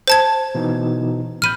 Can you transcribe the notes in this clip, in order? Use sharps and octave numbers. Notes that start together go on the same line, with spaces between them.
C5 A5 G#6
B2 E3 D#4
A1 B5 F6 G6 D#7